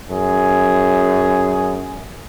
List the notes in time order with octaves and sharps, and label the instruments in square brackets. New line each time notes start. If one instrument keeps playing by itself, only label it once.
[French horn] F#2 [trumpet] G#4